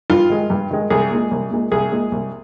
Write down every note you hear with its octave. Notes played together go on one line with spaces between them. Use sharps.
G2 F4
D#3 G#3
G2
D#3 G#3
C2 G#4
A#2 G#3
C2
A#2 G#3
C2 G#4
A#2 G#3
C2